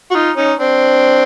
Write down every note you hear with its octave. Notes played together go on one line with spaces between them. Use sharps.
F#4
D#4 F4
C#4 D#4
C4 D4